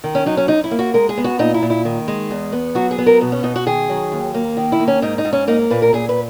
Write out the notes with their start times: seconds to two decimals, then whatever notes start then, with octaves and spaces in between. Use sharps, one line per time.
0.04 D#3
0.15 C#4
0.26 F#3 D#4
0.37 C#4
0.48 F#2 D#4
0.64 E4
0.71 A#3
0.79 F#4
0.94 G#3 A#4
1.09 G#4
1.17 B3
1.24 F#4
1.39 A#2 D#4
1.54 E4
1.62 A#2
1.70 E4
1.85 D#3
2.08 G#3
2.31 E2
2.52 B3
2.75 F#3 F#4
2.91 G#4
2.98 B3
3.06 A#4
3.21 B2
3.32 C#4
3.43 B2 D#4
3.56 F#4
3.66 D#3 G#4
3.89 F#3
4.12 D#2
4.34 A#3
4.57 D#3
4.72 E4
4.80 A#3
4.88 C#4
5.02 G#2 D#4
5.18 D#4
5.25 G#2
5.33 C#4
5.48 A#3 D#4
5.70 A#2 B4
5.82 A#4
5.93 A#2 G#4
6.09 B4